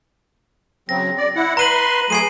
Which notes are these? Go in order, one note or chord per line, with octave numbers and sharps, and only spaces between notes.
C#3 F#3 C4 A#6
D5
E4 F#5
B4 A#5 C6 D#7 F#7
F#3 A3 G#4 G#5 C7 D#7